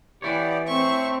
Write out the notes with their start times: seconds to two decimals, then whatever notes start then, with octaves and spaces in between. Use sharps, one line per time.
0.22 E3 B3 E4 G4 C#5 D5
0.67 A2 A3 C4 E5 C#6